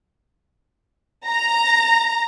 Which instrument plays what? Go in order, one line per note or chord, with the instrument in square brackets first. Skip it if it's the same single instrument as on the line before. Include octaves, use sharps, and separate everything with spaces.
[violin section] A#5